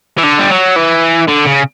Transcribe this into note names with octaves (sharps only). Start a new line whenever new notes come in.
E3
D3
G3
F#3
E3
D3
C#3